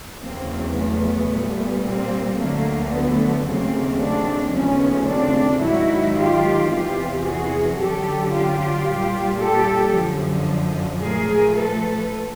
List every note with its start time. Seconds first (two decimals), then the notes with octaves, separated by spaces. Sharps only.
0.22 E2 C#3 F#3 A#3 C4
0.76 A3 B3
1.30 A#2 G3
1.84 A#3 C4
2.38 D2 D3 F#3 A3 A#3
2.92 A3 B3
3.46 D#2 C#3 F#3 A3 A#3 C4
4.00 C4 D4
4.54 D#2 C#3 F3 A3 B3 C#4
5.08 C4 D4
5.62 G#2 D#3 F#3 E4 F#4
6.16 F4 G4
6.70 E2 C3 E3 F4 G4
7.24 F#4 G#4
7.78 F#2 D3 F#3 G4 A4
8.31 F4 G4
8.86 A#2 G3
9.39 G4 A4
9.94 F#2 D3 F3
11.02 A#2 F3 A3 G#4 A#4
11.55 A4 B4